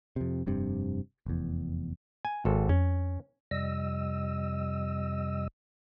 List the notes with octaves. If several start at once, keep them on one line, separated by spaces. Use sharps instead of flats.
F2 C3
F1 G2 C3
F1 E2
G#5
G#1 A4
F2 C#4
F2 C3 G3 D#5 E6